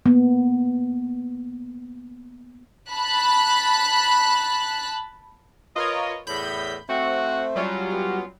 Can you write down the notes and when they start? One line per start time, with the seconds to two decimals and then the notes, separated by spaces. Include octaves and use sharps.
0.06 A#3 B3
2.91 A5 B5 F#6
5.76 F4 A#4 B4 C#5 D#5
6.27 E2 A2 B5 G6
6.89 A3 C4 F#4
7.56 F#3 G3 C#4 F4
7.92 B3